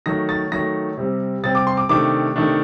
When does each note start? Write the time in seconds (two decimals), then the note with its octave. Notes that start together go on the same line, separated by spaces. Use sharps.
0.06 D#3 F#3 A3 A#6
0.29 A6
0.52 D#3 F#3 A3 A#6
0.97 C3 G3 C4
1.43 C3 G3 C4 A6
1.55 D6
1.67 C6
1.77 D6
1.89 C3 D#3 A3 D4 D6
2.36 C3 D#3 A3 D4